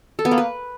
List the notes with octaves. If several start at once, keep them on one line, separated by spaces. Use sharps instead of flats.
A4
B3
A#3
B4